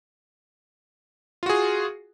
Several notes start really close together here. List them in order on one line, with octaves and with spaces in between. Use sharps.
F4 F#4 G#4